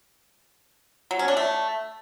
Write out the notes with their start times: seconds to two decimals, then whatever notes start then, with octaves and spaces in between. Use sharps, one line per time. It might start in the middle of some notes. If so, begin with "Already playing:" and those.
1.11 F#3
1.19 C#4
1.28 D4
1.37 A3